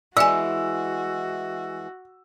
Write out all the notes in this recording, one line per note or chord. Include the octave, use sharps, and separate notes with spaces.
E3 G#3 F#4 D5 E5 G#5 E6